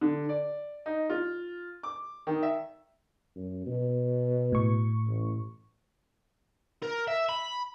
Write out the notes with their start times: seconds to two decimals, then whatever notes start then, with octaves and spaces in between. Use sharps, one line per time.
0.01 D3
0.29 D5
0.86 D#4
1.10 F4
1.83 D6
2.27 D#3
2.43 E5
3.36 F#2
3.66 B2
4.52 A2 C#6
5.07 A1
6.83 A#4
7.08 E5
7.29 B5